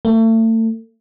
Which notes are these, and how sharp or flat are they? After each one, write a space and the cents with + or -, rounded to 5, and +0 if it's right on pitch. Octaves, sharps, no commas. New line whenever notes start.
A3 +35